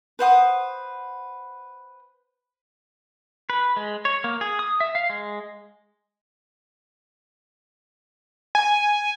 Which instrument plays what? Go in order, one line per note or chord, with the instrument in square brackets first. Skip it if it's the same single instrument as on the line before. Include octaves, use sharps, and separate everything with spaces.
[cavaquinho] B4 C5 F#5 D#6
[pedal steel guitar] B4
G#3
C#5
A#3
G#4
D#6
E5
F5
G#3
[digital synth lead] G#5